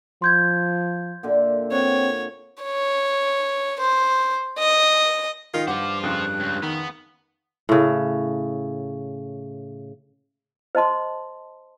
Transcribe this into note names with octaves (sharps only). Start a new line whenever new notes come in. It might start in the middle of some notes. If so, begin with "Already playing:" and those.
F3 C6 G6 G#6
A#2 D3 E5
C4 C#5 F#5
C#5
C5
D#5
D#3 D#4 F4
G2 C5 F5 F#5 D6
F2 C#3 F#6
C#2
D#3 B3
A2 C#3
C5 D#5 A5 C6